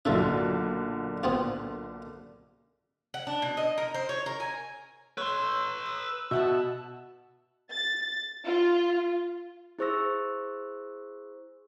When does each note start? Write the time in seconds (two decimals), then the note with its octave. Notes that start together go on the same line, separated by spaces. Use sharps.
0.05 B1 A#2 D3 F4 A4 E5
1.23 B3 C4 F4
3.14 F#5
3.27 D4
3.42 B2
3.57 D#5
3.78 A#4
3.94 C5
4.09 C#5
4.26 A#4
4.40 G#5
5.18 B4 C#5 C6 E6
5.86 D#6
6.31 B2 E5 F#5 A5
7.71 A6
8.46 F4
9.79 E4 G#4 C5 C#6 E6 A#6